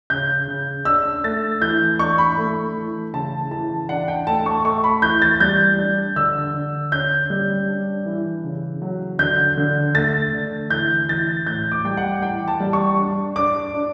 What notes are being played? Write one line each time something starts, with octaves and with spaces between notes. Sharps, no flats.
C#3 G6
C#3
D4 E6
A3 A6
E3 G6
D4 C#6
B5
A3
E3
C#3 A5
E3 A5
D4 F#5
G5
A3 A5
C#6
A3 C#6
B5
E3 G6
A6
G3 G6
D4
D3 E6
D3
C#4 G6
G3
D4
E3
C#3
F#3
D3 G6
D3
A3 A6
D3
E3 G6
E3 A6
A2 G6
D6
G3 G5
F#5
E3 G5
A5
G3
C#6
D4
D4 D6
D4